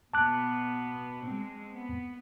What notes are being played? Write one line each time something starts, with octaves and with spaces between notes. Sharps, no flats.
B2 B3 A5 D6 F#6
G#3 C4
B3